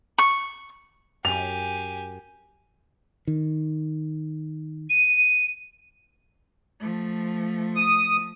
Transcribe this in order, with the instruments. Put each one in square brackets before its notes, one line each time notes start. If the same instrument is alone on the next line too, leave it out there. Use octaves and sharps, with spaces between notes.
[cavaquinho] C#6
[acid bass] F#2 [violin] G4 G#5 [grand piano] F7
[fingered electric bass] D#3
[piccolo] D#7
[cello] F3 A3
[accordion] D#6